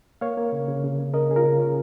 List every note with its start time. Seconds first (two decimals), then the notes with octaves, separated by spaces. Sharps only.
0.21 A#3 C#5 F5
0.37 A#3
0.52 C#3
0.68 C#3
0.84 C#3
0.99 C#3
1.14 C#3 A#4 D#5
1.29 C#4 G#4
1.36 F4 A#4
1.44 C#3
1.59 C#4